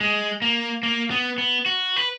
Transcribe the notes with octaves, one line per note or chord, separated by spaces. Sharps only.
G#3
A#3
A#3
B3
B3
F#4
B4